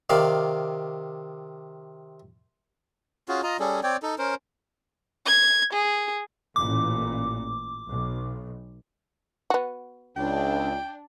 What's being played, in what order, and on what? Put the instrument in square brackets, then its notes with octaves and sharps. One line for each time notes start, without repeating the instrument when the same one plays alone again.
[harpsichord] C3 D#3 D5 F5
[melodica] C#4 F4 F#4 G#4
F4 D#5 A#5
G3 C#4 G#4 A4
C4 C#5 D5 G5
D#4 A4
C#4 A#4 C5
[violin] G#6
G#4
[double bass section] A1 A#2 [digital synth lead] D6
[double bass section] B1
[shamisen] B3 F#4
[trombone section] C#2 [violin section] D4 [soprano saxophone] G5